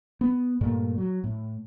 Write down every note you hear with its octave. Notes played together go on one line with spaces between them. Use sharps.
B3
G2 A#2 A3
F#3
A2